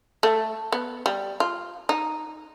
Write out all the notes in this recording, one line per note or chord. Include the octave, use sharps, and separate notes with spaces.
A3
B3
G3
F4
D#4